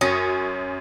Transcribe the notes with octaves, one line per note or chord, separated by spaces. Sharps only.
F#2 C#4 F#4 D#6 A#6